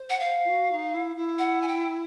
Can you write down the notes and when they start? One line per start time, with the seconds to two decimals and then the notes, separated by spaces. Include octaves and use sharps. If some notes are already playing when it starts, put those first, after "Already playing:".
Already playing: C5
0.10 F#5
0.20 F5
0.44 F4
0.49 F#4
0.71 D#4
0.94 E4
1.16 E4
1.39 F#5
1.62 G#5
1.68 G5